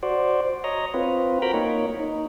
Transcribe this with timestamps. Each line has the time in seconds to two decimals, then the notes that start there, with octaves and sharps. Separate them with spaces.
0.03 F#4 C5 D5
0.64 C#5 D#5 A#5
0.94 C4 F4 B4
1.42 F#4 A#4 G5 A#5 B5
1.54 A#3 D#4 C#5
1.99 D#4